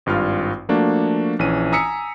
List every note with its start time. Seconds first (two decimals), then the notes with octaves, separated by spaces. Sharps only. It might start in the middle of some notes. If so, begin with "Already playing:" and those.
0.06 G#1 G2 F4 F6
0.69 F3 A3 A#3 D4 F#4
1.39 A#1 E3 C#4 D#7
1.72 G#5 A#5 D#6 E6 B6 C#7